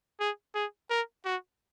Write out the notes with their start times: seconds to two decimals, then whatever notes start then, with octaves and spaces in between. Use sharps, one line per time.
0.20 G#4
0.55 G#4
0.90 A#4
1.25 F#4